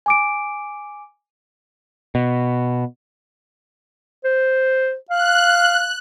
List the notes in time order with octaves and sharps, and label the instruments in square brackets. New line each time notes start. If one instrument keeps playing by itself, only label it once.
[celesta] G#5 D6 D7
[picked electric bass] B2
[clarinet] C5
[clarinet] F5 [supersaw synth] F#6